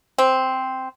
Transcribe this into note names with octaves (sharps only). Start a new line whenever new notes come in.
C4